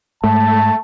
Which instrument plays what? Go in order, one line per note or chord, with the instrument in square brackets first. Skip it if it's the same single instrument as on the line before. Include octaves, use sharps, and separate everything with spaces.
[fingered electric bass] G#2 [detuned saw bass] A3 [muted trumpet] A5